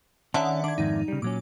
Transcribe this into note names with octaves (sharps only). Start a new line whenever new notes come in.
D3 D#3 C#4 D5 E5 F#5
D4 D6 G#6
F2 G#2 D#3 D#4
C#3 G3
A#2 F#3 C#4 D6